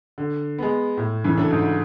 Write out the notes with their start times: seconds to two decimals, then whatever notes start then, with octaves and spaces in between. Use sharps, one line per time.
0.18 D3
0.58 G#3 B3
0.97 A2
1.24 C#3 E3
1.37 F#3 A3 D4 A4
1.51 G#2